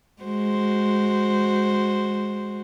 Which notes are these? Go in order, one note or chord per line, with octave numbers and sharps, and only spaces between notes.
G#3 F#4 C5